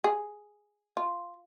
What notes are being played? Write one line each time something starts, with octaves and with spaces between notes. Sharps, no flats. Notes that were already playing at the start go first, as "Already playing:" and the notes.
G#4
F4